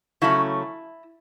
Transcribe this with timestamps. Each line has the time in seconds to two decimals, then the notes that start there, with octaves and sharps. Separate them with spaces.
0.22 C#3 F#3 A3 C#4 E4